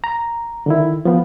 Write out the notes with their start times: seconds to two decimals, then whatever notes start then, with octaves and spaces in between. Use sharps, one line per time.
0.04 A#5
0.66 D3 D#3 E4
1.05 F3 B3